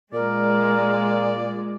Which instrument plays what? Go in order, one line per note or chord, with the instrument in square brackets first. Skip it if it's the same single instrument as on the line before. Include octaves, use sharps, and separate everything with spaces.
[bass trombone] A#2 [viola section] G#3 [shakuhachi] A#4 [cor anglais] D5